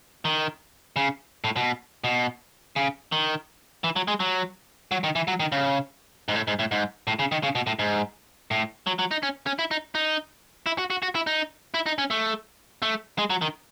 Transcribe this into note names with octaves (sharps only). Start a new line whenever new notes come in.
D#3
C#3
A2
B2
B2
C#3
D#3
E3
F#3
G#3
F#3
F#3
D#3
E3
F#3
D#3
C#3
G#2
A2
G#2
A2
G#2
A2
C#3
D#3
C#3
B2
A2
G#2
A2
F#3
F#3
D#4
C#4
C#4
E4
D#4
D#4
E4
F#4
F#4
F#4
E4
D#4
E4
D#4
C#4
A3
A3
G#3
F#3
D#3